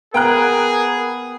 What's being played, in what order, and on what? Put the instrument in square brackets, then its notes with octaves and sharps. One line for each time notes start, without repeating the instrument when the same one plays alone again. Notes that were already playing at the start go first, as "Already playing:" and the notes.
[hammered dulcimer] B3 F5 [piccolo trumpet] G#4 [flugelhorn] A#4 [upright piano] G5 A#5 F#6